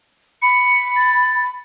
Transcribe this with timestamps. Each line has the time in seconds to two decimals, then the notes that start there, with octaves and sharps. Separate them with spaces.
0.42 B5 C#7
0.96 A6